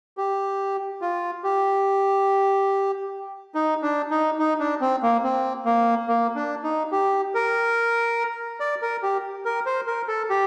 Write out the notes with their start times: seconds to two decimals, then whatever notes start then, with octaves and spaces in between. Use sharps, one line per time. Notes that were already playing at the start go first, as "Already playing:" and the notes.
0.17 G4
1.01 F4
1.44 G4
3.55 D#4
3.82 D4
4.11 D#4
4.39 D#4
4.60 D4
4.81 C4
5.03 A#3
5.24 C4
5.65 A#3
6.08 A#3
6.35 D4
6.63 D#4
6.92 G4
7.35 A#4
8.60 D5
8.82 A#4
9.03 G4
9.45 A#4
9.66 C5
9.87 A#4
10.08 A4
10.30 G4